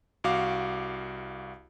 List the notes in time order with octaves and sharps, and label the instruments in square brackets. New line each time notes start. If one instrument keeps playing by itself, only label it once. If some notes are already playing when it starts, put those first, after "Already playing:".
[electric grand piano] C2 F#4 F5 D6